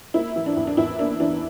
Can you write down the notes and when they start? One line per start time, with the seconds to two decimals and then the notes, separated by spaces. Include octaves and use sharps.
0.14 A#3 E4
0.36 E3
0.46 D4
0.57 E2
0.67 D4
0.77 E2 E4
0.99 A#3 D4
1.20 E3 D4